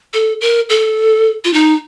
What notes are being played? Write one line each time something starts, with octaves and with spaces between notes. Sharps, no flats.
A4
A#4
A4
F4
D#4